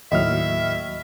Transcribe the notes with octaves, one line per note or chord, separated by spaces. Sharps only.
D#2 A2 F#3 D#5 E5 F6